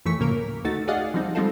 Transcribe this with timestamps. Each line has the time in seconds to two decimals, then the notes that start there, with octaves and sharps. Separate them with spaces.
0.05 F#2 E3 F3 A3 C#6 B6
0.18 D2 A2 C#3 A#3 A#4
0.64 D2 A3 D#4 F#4 A6
0.88 F#4 G#4 D5 D#5 F5 F#5
1.14 F3 G3 C4 D#4
1.35 G3 G#3 C4 D#4 F4 A4